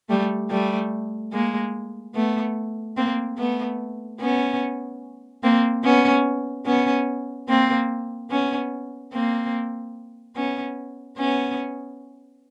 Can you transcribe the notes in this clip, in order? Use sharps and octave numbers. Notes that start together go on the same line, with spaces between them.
G3 A3
G3 A3
G#3 A#3
A3 B3
A#3 C4
A3 B3
B3 C#4
A#3 C4
B3 C#4
B3 C#4
A#3 C4
B3 C#4
A#3 C4
B3 C#4
B3 C#4